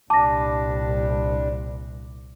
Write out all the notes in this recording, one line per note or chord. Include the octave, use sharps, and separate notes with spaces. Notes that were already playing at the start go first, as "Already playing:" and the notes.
C2 A#2 G3 D4 A5 D6 A#6